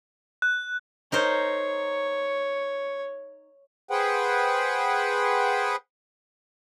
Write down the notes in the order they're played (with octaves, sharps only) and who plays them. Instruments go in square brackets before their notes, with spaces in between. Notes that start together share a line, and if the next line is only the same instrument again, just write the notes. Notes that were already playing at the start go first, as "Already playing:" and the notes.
[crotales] F#6
[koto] D#4 A#4 C5 [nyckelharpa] C#5
[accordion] G#4 B4 C5 F#5 G5